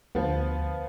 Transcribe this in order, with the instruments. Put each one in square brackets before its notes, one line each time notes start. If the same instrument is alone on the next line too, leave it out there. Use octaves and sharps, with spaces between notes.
[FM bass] D2 [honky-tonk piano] F3 B3